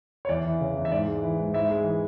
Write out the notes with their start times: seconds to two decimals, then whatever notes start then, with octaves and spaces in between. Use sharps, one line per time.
0.25 C#5
0.29 E2 D5
0.45 E3
0.61 C#3
0.77 E2
0.85 E5
0.91 G#2 D5
1.07 G#3
1.23 E3
1.38 G#2
1.53 G#2 E4 E5
1.70 G#3
1.84 E3